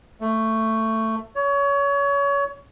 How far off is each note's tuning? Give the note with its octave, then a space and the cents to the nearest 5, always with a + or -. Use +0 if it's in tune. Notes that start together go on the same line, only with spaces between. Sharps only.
A3 +15
C#5 +25